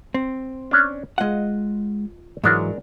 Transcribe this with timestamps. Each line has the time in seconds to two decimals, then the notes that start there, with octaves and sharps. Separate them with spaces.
0.14 C4
0.71 C#4 D4
1.18 G#3 F4 D#5 F#5
2.44 G#2 E3 F#3 G#3 D4 A#4